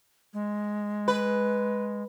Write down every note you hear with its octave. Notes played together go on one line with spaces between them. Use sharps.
G#3
B4